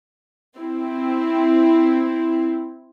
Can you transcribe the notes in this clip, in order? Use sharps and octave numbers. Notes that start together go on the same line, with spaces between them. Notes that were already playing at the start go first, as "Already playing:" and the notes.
C4 E4